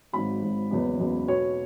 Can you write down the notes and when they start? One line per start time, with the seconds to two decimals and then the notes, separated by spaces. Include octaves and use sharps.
0.13 G#1 G#2 F#3 B5
0.42 G#1 G#2 F#3
0.71 F#1 E2 C#3 F#3 B3
0.99 F#1 E2 C#3 F#3 B3
1.28 B1 B2 F#3 C#5